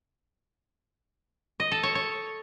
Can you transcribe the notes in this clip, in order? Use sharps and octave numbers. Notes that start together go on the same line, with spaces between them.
D#5
A4
C#5
C#5